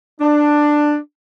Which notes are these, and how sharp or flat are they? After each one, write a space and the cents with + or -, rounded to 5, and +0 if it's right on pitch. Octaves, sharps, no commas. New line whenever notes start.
D4 +10